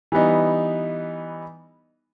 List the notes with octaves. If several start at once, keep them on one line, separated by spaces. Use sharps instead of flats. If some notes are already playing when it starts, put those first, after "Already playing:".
E3 G3 B3 D#4